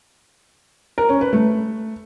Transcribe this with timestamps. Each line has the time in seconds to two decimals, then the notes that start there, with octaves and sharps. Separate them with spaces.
0.98 A#4
1.09 C#4
1.21 B4
1.33 A3